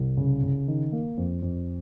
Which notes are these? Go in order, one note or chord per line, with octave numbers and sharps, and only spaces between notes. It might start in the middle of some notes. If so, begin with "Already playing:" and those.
Already playing: C2
C#3
C#3
D#3
A#3
F2
F2